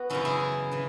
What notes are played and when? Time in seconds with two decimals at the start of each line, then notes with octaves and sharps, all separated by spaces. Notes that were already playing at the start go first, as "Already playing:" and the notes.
Already playing: B3 F#4
0.10 F#2 C#3 E3 C#4 E4
0.25 E4 G#4
0.72 C#3 E3